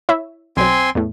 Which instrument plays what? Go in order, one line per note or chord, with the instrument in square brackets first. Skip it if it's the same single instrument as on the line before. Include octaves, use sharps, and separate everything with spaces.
[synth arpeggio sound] E4 C#5 E5
[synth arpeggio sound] B1 F#3 [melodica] C4 G#5 C6
[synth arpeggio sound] E2 A2